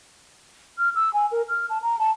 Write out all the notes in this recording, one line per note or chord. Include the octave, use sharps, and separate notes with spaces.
F6
E6
G#5
A#4
F6
A5
A#5
A5